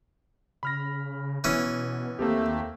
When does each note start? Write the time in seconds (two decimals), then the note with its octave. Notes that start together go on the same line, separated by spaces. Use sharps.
0.63 C#3 B5 F6 A#6
1.44 B2 E3 B3 C#4
2.19 D#2 A3 A#3 C4 G4